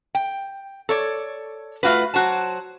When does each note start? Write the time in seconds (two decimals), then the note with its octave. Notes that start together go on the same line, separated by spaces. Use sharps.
0.15 G5
0.89 A4 C#5 D5
1.83 A3 F4 F#4 B4
2.14 F#3 F#4 C5 A5